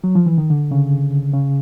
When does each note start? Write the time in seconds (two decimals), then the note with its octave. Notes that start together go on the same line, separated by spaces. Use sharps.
0.04 F#3
0.15 F3
0.26 E3
0.38 D#3
0.50 D3
0.71 C#3
1.33 C#3